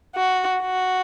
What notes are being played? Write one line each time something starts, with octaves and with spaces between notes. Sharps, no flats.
F#4
F#4